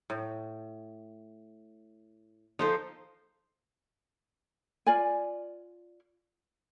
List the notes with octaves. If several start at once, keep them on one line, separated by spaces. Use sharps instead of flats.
A2
F3 D#4 A4 C5
F4 D5 G#5